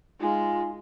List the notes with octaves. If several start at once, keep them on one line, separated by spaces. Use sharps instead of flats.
G#3 D#4 F4 G#5